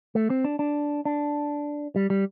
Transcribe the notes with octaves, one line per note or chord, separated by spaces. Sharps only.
A3
C4
D4
D4
D4
G3
G3